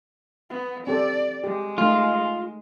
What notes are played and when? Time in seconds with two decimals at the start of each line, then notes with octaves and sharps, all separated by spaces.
0.50 B3
0.87 C4 G4 A4 D5
1.44 G#3 G4
1.78 A3 D#4 F4